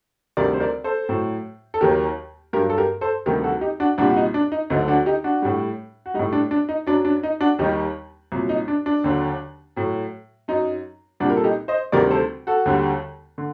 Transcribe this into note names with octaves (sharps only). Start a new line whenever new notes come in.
D2 C3 D#3 G3 A#4 D5
C5
A#4 D5
A4 C5
A2 F#3
A4
D#2 D#3 F#3 G4 A#4
G2 F#3 G4 A#4
A4
G4 A#4
A4 C5
D2 C3 D#3 G3 G4 A#4
F#4 A4
D#4 G4
D4 F#4
C2 A#2 G3 D4 F#4
F#4
D#4
D4
D#4
D2 D3 F#3 D#4
D4 F#4
D#4 G4
D4 F#4
A2 G3
F#4
A2 G3 D#4
D4
D4
D#4
F#2 F#3 D4
D4
D#4
D4 F#4
D#2 D#3 G3 D#4 G4
C2 A#2 F#3
D#4
D4
D4
D#2 D3 F#3
A2 F#3
F#2 F#3 D#4
C2 A#2 G3 D4 F#4
A#4
A4
D#4 G4
C5 D#5
D2 C3 D#3 G3 A#4 D5
A4 C5
F#4 A4
D#2 D3 G3
D3